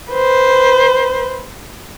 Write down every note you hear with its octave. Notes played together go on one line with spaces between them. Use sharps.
B4 C5